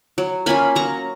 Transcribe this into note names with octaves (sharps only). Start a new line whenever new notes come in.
F#3
A#3 C#4 F4 G#5 B5
F#3 A#5 C#6